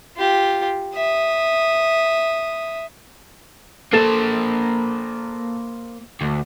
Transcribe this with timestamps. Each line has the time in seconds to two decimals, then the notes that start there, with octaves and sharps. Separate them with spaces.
0.17 F4 G4
0.95 E5 D#6
3.93 A#3 A4 C5 A6 E7
6.21 D2